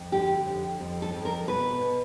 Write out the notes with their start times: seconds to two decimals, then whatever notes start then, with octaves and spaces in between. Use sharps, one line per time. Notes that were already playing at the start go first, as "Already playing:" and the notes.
Already playing: F2
0.12 D3 G4
0.47 F2
0.80 F2
1.02 A4
1.14 F2
1.25 A#4
1.48 B2 B4
1.81 B2